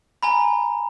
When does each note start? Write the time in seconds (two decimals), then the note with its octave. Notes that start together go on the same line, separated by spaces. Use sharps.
0.23 G#5 A#5 B5